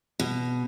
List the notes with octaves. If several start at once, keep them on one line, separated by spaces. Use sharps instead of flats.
B2